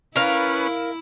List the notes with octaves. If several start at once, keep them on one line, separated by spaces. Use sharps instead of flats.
C#4 E4 A#4 B4 F5